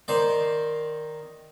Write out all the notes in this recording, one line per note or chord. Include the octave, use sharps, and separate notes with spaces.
D#3 C5 D5